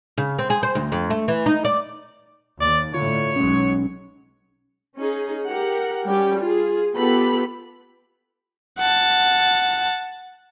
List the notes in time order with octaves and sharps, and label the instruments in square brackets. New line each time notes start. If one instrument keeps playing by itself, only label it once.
[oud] C#3
C4
G#4
C5
D2
F2
A3
E3
D#4
D5
[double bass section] D#2 [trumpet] D5
[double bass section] A2 D3 [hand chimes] F4 [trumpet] C#5
[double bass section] B1 F#3 G#3 [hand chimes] C#4
[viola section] C#4 D#4 G#4
G4 A#4 F#5
G3 C#4 G4
F4 G#4
B3 F4 G4 A4 B5
[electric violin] F#5 A5